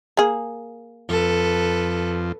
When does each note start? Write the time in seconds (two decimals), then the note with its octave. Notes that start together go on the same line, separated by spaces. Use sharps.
0.17 A#3 G#4
1.09 F2 A4 B4